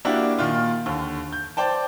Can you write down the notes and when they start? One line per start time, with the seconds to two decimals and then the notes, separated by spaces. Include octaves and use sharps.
0.05 A#3 D4 E4 F#4 G4
0.38 A#2 D#3 F4
0.86 D#2 D3
1.33 G6
1.57 C5 D5 G5 A5